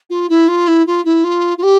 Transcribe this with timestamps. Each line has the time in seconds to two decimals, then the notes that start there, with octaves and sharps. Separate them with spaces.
0.10 F4
0.29 E4
0.48 F4
0.67 E4
0.86 F4
1.05 E4
1.24 F4
1.58 F4
1.63 G4